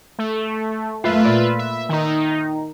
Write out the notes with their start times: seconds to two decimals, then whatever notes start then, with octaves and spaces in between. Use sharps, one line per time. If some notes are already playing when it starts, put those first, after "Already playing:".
0.19 A3
1.04 F#2 A3 F4 B4 E5 F5
1.25 A#2 D5
1.59 E5
1.89 D#3 D#4